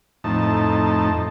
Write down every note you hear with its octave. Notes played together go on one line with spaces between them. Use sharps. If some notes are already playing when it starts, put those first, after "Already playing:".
F2 A2 D#4 A5